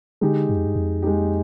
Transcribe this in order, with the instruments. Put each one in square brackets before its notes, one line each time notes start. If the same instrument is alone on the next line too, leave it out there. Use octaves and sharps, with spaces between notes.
[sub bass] D3 [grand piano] G#3 D#4 G4
[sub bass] G2
F2
G2
F2
[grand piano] G#3 D#4 G4